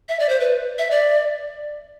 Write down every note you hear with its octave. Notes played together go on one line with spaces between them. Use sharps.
E5
D5
C5
B4
E5
D5